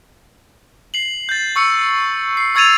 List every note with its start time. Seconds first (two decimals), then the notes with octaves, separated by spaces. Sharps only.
0.94 C7 F#7
1.29 G6 A6
1.56 C#6 E6 C#7
2.37 C7
2.55 C#6 E6 G#6 A6 D#7 F7